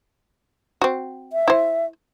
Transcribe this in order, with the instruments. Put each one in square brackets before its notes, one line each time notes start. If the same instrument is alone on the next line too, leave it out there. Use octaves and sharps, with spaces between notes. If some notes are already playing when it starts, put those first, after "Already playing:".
[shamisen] C4 F#4
[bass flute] E5
[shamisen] E4 C5